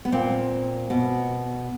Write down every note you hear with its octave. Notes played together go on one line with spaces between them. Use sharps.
B3
A#2 A#3 C4
B2